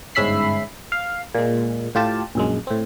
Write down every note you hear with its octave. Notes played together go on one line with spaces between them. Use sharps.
G1 G#2 C#4 E5 B5 C7
F5
A#2 G#3
A2 F4 G4 A5
A#1 F#2 G#3
A2 C4